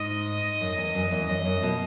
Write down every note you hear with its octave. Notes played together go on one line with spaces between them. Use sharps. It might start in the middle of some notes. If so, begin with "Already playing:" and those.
Already playing: G#2 D#5
F#2
E2
F#2
E2
F#2 D#5
F#2
B2